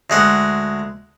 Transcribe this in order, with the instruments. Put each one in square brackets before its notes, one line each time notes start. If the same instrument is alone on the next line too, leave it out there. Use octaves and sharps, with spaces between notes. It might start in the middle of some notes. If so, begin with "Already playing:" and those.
[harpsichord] D2 G#3 F#5